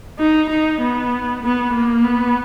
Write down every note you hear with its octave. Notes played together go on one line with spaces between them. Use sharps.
D#4
D#4
B3
B3
A#3
B3